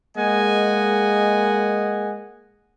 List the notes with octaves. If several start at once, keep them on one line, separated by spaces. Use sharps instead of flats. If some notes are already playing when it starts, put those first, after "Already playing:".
G#3 A#3 G#4 D#5 F#5 G#5